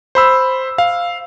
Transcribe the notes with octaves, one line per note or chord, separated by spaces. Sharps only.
C5 B5 E6
F5